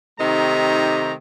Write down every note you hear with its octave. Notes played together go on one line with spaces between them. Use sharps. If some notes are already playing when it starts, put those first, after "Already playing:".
C3 D#3 A3 D#4 G4 A#5